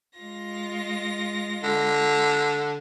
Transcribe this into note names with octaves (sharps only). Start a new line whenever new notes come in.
G#3 F4 A#6
D3